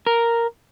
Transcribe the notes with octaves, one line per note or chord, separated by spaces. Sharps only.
A#4